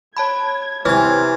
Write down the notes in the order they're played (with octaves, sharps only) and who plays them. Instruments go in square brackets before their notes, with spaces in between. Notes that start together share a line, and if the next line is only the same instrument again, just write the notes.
[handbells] C#5 A5 B5 [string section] G#6
[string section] C3 C4 [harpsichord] E3 [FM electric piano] C#5 G#5 [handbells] F6 G#6